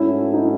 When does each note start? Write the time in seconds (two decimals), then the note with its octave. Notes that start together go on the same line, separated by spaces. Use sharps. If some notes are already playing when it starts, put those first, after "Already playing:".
Already playing: G#2 F#3 A3 C#4 E4
0.33 D#4